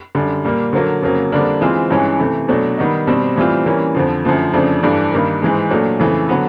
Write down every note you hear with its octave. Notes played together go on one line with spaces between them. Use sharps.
F#2 D3 G3
A#2 G3 A#3
D3 F#3 A#3
F2 C#3 F#3 A#3
F2 D3 G3 A#3 D4
E3 G#3 C4 F4
G2 E3 G#3 C#4
C3 E3 A3
B2 F#3 A3 D4
D#3 G3 B3 D#4
B2 G3 C4
A2 E3 G3 C4 F4
E3 G3 A#3 C#4
F2 D3 F3
F#2 D3 F3 A3
F2 C#3 F3 A3 D4
G2 E3 A3 D4
G2 D#3 G3 A#3
G#2 E3 G#3
A#2 F#3 A3 D4
F2 C#3 E3 A3
D3 F#3 B3